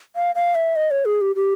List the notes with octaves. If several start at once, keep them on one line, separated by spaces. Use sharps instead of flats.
F5
F5
E5
D#5
C#5
G#4
G4
G4